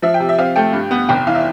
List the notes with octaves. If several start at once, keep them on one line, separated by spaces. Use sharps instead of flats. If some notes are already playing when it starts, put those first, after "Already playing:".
F3 E5
G5
C3
E5
C4 F5
A3 G5
G2
B3
F1 G5
E3 F5
E5